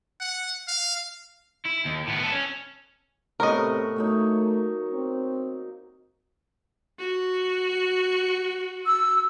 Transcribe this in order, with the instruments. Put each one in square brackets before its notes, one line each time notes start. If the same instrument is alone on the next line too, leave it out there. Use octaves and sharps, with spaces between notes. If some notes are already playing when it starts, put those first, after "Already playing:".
[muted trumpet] F#5
F5
[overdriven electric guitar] E4
D#2
A2 B3
B3 A4
C#4
[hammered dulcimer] A2 B3 C#5 [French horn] C3 [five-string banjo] A#4 D#5
[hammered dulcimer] F#3 A#3 D#4 [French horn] A3
[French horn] C4
[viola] F#4
[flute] E6